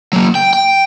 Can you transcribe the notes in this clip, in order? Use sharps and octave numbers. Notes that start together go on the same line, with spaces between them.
F#3 A#3
G5
G5